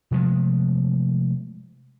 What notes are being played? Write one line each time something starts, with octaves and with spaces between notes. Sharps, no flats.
C3 F3 G#3 A3